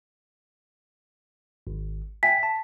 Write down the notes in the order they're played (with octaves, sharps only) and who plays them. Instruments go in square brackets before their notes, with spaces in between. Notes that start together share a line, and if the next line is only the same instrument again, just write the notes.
[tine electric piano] G#1
[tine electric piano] E5 G5 G#5 [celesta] B6
[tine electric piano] A5